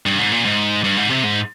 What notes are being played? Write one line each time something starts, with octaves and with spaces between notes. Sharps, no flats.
G2
G#2
A#2
G#2
G2
G#2
C3
G#2